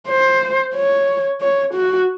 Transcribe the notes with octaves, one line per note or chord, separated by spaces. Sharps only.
C5
C#5
C#5
F#4